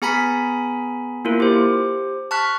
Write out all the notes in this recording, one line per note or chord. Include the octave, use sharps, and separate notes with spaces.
B3 G#4 G#5 A#5 B5 B6
A#3 E4 F4 A#4
G4 C5
A5 C#6 F6 F#6 B6